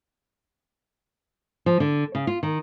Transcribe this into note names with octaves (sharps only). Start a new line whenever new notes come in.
F3
D3
C#3
F4
D#3